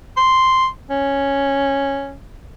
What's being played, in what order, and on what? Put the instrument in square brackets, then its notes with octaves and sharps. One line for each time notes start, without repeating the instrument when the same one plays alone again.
[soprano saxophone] C6
C#4